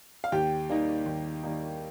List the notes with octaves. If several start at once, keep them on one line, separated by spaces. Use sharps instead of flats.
F5
D#2 G4 G5
D#3 G3 A#3 D#4
D#2
D#3 G3 A#3 D#4